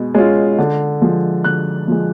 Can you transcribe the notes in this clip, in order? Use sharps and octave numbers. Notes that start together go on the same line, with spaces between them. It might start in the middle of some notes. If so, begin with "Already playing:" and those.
Already playing: B2 G#3
G#3 C#4 F4
D3
F3 G#3
D3 F#6
F3 G#3